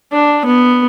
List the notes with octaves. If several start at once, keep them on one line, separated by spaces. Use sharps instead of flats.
D4
B3